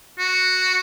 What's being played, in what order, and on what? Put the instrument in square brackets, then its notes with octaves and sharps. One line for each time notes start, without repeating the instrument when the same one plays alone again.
[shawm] F#4